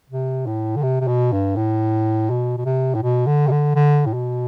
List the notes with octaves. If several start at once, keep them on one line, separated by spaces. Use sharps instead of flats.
C3
A2
D3
C3
C3
B2
G2
A2
B2
B2
C3
A2
B2
D3
C3
D3
D3
A2
B2